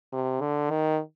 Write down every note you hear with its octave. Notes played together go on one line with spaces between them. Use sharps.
C3
D3
D#3